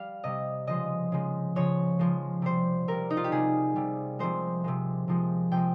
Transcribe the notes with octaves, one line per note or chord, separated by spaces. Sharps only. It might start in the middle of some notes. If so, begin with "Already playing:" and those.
Already playing: G3 F5
C3 G3 D#5
C#3 F3 G#3 D#5
C#3 F3 G#3
C#3 F3 G#3 C#5
C#3 F3 G#3
C3 G3 C5
C3 G3 A#4
D#4
F4
G4
C3 G3 G#4
C3 G3
C3 F3 G#3 C5
C3 F3 G#3
C3 F3 G#3
C3 F3 G#3 G5